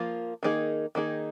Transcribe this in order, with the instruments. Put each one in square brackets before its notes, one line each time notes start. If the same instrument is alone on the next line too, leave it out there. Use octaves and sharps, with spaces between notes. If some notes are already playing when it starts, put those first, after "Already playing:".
Already playing: [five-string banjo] F3 A#3 F4
D#3 A#3 D#4 G#4
D#3 A#3 D#4 G#4